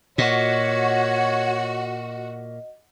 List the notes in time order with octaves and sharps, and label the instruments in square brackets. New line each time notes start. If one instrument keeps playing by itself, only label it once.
[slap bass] A#2 [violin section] F#4 [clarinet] C#5 [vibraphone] D#5